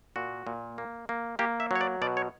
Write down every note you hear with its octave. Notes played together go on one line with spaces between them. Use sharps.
A#2 F#4
A#2
A#3
A#3
A#3 G4
E5
F#3 C#5
D5
B2 D5
C#5